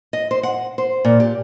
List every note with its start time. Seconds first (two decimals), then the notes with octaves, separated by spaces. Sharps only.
0.13 D#5
0.31 C5
0.43 F#5
0.78 C5
1.05 A#2
1.20 G4